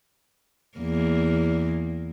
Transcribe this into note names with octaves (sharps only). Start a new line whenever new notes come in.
E2 A#3